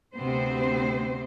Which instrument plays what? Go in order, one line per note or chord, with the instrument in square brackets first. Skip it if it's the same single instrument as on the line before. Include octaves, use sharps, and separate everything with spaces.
[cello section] D2 C3 B3 C4 C5